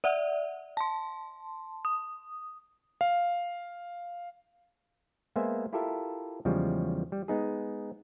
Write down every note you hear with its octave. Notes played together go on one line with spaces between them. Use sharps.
D5 E5 F#5
A5 C6
D#6
F5
G#3 A#3 B3 C5 E5 G#5
E4 F4 G4 A4 A#4 E5
E2 C#3 F3 G3 G#3
G3
G#3 B3 D#4 G#4